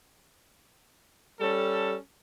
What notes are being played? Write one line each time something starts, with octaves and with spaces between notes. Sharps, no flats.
G3 C#4 A4